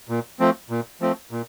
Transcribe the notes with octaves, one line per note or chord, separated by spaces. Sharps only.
A#2
F3 A3 C4
A#2
F3 A3 C4
A#2